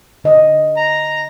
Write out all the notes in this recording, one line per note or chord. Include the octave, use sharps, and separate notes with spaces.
D3 D#5
A#5